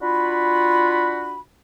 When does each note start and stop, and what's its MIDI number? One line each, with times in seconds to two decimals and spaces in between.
0.02 1.40 62
0.02 1.40 65
0.02 1.40 66
0.02 1.40 83